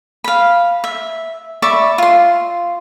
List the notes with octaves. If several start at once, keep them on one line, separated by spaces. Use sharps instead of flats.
F5 B5
E5
D5 E5 B5 C#6
F4 C6